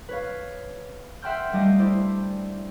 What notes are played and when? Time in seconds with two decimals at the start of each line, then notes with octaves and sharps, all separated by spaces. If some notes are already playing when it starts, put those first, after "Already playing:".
0.09 B4 C#5 F5
1.22 E5 F#5 G5 C6 F6 G6
1.53 G3 A3 D4 G4 D#5 F5
1.79 E4 C5 D5